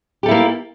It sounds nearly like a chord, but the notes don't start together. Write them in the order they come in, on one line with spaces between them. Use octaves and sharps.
G4 A4 E4 A#3